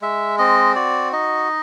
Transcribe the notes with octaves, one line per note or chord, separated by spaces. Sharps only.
G#3 E5
C4 D#5
F#4 D5
D#4 D#5